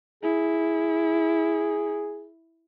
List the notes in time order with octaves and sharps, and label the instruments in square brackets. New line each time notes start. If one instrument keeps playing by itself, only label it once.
[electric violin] E4 [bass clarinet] G#4